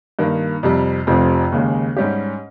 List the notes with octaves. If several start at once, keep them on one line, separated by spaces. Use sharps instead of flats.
G2 D#3 A#3
F2 C3 G3
F1 F2 C3 F3 C4
D#2 C#3 G#3
G#2 G3 C#4 G4